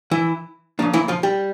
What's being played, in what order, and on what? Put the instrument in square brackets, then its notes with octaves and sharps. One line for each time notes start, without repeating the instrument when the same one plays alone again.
[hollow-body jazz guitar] E3 E4
C#3 F3 A#3 D4
E3 E4
F3 F4
G3 G4